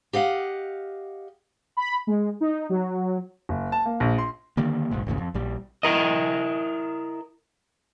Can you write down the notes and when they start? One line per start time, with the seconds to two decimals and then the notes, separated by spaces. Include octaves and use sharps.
0.13 G4 D#5 F5 F#5
1.77 B5
2.07 G#3
2.41 D#4
2.69 F#3
3.49 F#1
3.72 A5
3.86 A#3
4.00 A#1
4.18 C6
4.57 D3 D#3 G3 A#3
4.91 F#1 B1 G#2
5.07 G#1 E2 A2 C#3
5.18 F2
5.34 A#1 G3
5.83 E4 A#4 D#5